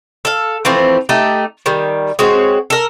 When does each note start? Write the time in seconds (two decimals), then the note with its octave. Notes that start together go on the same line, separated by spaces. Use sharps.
0.25 A4 F5
0.65 E3 F3 A3 C4
1.09 A3 D#4 G4
1.66 D#3 G3
2.19 G#3 C4 F#4 C#5
2.70 A4 A#4